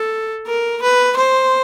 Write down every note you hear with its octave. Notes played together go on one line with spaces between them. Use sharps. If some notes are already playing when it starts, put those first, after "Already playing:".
Already playing: A4
A#4
B4
C5